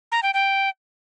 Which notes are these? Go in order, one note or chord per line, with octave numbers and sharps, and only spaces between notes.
A#5
G5
G5